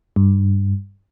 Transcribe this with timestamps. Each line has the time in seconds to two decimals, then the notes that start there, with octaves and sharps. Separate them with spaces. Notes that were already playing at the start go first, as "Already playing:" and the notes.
0.16 G2